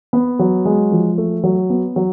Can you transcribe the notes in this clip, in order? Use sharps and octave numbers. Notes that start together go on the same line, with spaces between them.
B3
F#3
G#3
F3
A3
F#3
B3
F#3